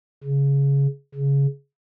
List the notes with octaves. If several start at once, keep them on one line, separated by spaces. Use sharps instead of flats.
C#3
C#3